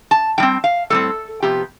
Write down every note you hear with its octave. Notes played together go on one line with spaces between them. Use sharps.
A5
A2 G3 C4 G5
F5
A2 G3 C4 A4
C3 F3 B3 G4